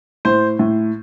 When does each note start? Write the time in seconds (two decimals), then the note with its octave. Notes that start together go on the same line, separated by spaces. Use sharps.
0.25 A2 C5
0.59 A2